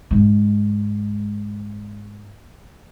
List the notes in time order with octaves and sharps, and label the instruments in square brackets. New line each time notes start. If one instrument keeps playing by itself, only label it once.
[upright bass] G#2 G#3